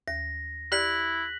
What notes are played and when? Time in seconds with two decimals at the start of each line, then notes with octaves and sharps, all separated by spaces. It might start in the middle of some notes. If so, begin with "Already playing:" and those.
0.08 D#2 A#6
0.72 E4 G4 D5 F#6 B6 F#7